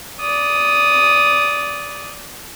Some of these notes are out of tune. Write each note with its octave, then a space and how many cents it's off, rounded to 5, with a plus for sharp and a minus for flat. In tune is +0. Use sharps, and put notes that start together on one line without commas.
D5 -15 D#6 +0